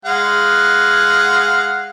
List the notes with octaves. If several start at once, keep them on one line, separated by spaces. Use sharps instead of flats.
G#3 F5 F#5